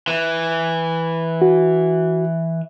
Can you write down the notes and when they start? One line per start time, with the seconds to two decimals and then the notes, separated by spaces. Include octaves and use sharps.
0.08 E3
1.42 F#4